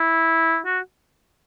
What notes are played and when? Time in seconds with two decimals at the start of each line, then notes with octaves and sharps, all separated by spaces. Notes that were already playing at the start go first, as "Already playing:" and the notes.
Already playing: E4
0.66 F#4